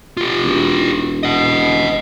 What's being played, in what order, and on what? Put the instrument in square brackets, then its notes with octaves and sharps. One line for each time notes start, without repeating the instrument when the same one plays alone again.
[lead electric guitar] F4 G4
[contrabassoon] E1
[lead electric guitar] D#5 F#5